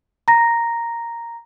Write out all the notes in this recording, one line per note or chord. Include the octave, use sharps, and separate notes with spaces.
A#5 A#6